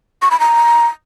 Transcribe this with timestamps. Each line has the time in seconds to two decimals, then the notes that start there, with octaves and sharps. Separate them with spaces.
0.22 C#6
0.31 B5
0.40 A#5